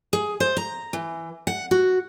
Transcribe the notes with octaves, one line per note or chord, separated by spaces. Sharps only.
G#4
C5
A#5
E3
F#5
F#4